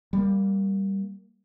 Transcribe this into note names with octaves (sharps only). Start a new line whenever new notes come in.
G3 A#3